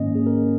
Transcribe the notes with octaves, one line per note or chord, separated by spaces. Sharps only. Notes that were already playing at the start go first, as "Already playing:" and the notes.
Already playing: G#2 D#3 A#3 C#4 D#5
G#4
A#4